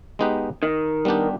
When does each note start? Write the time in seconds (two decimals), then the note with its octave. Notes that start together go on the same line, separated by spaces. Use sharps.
0.19 G#3 B3 D#4 G4 B4
0.63 D#3
1.05 G3 B3 D4 G4